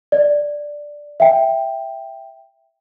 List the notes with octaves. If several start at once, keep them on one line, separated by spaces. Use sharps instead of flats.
D5
E5 G5